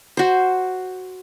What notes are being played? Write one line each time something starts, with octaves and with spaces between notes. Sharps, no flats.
F#4 C5